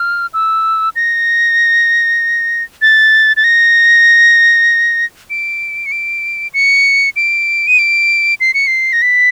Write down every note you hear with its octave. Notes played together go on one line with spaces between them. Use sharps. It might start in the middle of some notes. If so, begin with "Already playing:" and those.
Already playing: F6
E6
A#6
A6
A6
A#6
D7
C#7
D7
C#7
D7
D#7
D7
C7
C#7
C7
A#6
B6